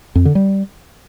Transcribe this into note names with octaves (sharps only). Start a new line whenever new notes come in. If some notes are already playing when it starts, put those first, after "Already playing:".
F2
D3
G3